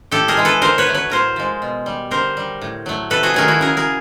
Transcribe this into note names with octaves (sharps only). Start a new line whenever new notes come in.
A2 G4 A4
G#4 A#4
E3 G#3
A4 B4
D3 A#4 C5
B4 C#5
F#3 A3
B4 C#5
A2 A#4 C5
F3 G#3
B2
G3
D3 A#4 C5
G3
A2
F#3 A3
C3 A4 B4
F#4 G#4
D#3 F#3 A3 G#4 A#4
E4 F#4
C#3 G#4 A#4
G#4 A#4